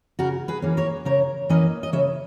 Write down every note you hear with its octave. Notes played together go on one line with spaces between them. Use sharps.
C#3 F#4 A#4
G#4 B4
E3 A#3 C#4
A#4 C#5
C#3 A#4 C#5
E3 A#3 C#4 B4 D#5
D#5
C#3 C#5 E5